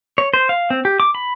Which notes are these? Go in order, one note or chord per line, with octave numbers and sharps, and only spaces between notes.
C#5
C5
F5
C4
G4
D6
B5